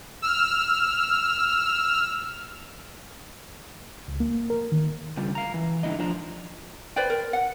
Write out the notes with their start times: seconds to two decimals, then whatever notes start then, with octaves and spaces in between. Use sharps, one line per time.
0.22 E6 F6
4.08 C#2
4.20 A#3
4.50 A#4
4.72 D#3
5.17 C#3 G3 F4
5.35 F5 A#5
5.54 E3
5.83 G#2 D3 E3 D#4 E4 D#5
5.99 F3 D4 F4 C5 D5 A#5
6.96 B4 C5 D5 G5
7.10 A#4
7.33 F#5